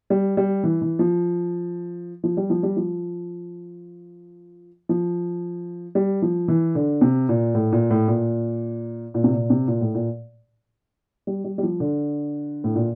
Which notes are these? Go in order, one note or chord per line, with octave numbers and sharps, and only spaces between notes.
G3
G3
E3
E3
F3
F3
G3
F3
G3
F3
F3
G3
F3
E3
D3
C3
A#2
A2
A#2
A2
A#2
A#2
C3
A#2
C3
A#2
A2
A#2
G3
G3
G3
F3
D3
A2
A#2